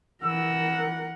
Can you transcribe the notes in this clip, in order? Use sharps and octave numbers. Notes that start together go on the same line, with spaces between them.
E3 A#4 F#5 E6